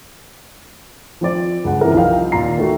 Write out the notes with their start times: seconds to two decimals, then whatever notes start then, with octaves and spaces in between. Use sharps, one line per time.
1.21 F3 C4 D5
1.64 C#2 G2 F#5
1.81 C3 E3 A#4
1.94 C2 F3 D#4 F5 G5
2.32 D#2 A#2 F4 A#5 C7
2.58 D#3 A3 F#4